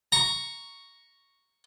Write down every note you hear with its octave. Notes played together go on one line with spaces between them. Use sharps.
A#5 C#6